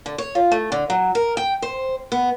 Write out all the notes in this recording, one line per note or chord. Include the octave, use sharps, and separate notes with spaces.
D3
C#5
F4
A3
D3
F#3
A#4
G5
C5
B3